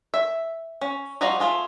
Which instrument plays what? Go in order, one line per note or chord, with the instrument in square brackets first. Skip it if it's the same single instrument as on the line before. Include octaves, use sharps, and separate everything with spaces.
[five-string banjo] E5
C#4
F3 G3 F#4 D#5 A#5
A3 F4 G#4